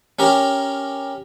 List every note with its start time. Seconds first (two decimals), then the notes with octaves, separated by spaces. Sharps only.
0.19 C#4 G4 A#4